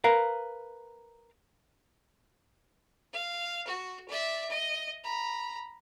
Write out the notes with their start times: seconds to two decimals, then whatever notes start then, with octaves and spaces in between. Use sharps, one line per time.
0.04 A#4 B4 F5
3.13 F5
3.67 F#4
4.08 D5 E5
4.50 D#5
5.04 A#5 B5